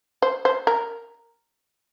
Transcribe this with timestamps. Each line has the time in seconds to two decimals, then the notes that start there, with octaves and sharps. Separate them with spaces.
0.22 C5
0.45 C5
0.67 A#4